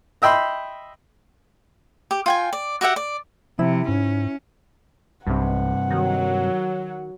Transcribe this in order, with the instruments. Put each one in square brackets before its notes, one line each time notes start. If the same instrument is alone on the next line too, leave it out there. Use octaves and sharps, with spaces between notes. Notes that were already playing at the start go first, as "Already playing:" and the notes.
[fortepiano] D#5 E5 G5 B5 C6
[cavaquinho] G4
F4 G5 G#5
D5
F#4 G4 E5 F#5
D5
[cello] C3 [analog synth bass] F3 [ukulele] E4
[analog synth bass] G#2 [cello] C#4
[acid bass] B1 [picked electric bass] G2 C3 [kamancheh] F#5
[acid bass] D#3 [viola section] F#3